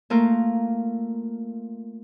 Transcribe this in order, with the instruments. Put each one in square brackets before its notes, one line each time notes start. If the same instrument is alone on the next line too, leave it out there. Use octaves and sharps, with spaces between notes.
[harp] A3 A#3 F4 A#4